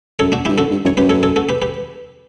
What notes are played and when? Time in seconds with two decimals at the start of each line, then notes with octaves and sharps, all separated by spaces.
0.19 F#2 A4 C#5
0.32 D4 F#4
0.45 G2 E4 G4
0.58 F#2 F#4 A4
0.71 G2
0.85 F#2 C#5
0.97 F#2 G4 B4
1.09 A4 C#5
1.23 A4 C#5
1.36 F#4 A4
1.49 G4 B4
1.62 G4 B4